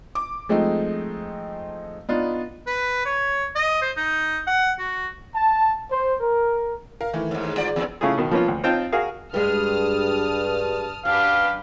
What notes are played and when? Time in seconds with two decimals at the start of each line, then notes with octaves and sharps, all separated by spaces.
0.15 D6
0.49 F3 G#3 A3 C4 D#4
2.09 B3 D4 D#4 F4
2.67 B4
3.05 C#5
3.55 D#5
3.82 C5
3.97 D#4
4.47 F#5
4.79 F#4
5.35 A5
5.90 C5
6.21 A#4
7.01 A#4 F5
7.13 D#3 E3 A3
7.31 D#2 G#2
7.56 G#2 F4 D5
7.76 E2 G#2 B3
8.01 C#3 A3 E4 F4 G#4
8.18 B2 D#3
8.31 F3 A#3 B3 C#4 F4
8.48 D2
8.64 C4 D#4 F4 G5 A5
8.92 F#4 G#4 A#4 F5
9.34 G2 G3 G#3 A5 D#6 F6
11.05 F#2 D4 G4 B4 F5